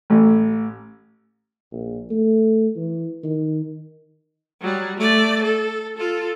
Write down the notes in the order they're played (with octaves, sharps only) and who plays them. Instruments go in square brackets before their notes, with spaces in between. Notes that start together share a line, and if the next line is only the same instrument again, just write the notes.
[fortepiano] A1
[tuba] A#1
A3
E3
D#3
[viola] F#3 G3
A3 D5
A4
F4 A4